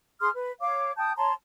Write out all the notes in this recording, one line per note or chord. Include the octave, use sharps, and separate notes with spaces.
G#4 C6 D#6 F6
B4
C#5 F5 D6
G5 A5 D#6 G6
C#5 A5 A#5 C6